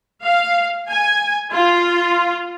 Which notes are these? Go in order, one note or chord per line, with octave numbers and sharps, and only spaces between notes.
F5
G#5
F4